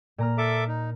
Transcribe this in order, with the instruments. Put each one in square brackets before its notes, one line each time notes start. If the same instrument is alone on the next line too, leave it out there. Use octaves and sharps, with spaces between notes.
[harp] A#2 A#5 F6
[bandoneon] A4 E5 D6
D#4